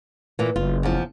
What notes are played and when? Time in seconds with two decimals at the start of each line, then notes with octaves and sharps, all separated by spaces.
0.39 A#2 E3
0.56 F#1 F4
0.83 E2 F3